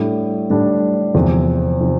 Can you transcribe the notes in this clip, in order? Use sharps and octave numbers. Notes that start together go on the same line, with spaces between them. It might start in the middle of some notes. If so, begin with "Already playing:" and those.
Already playing: A2 G3 D4
A2 G3 D4
E2 C3 F3 C4
C3 F3 C4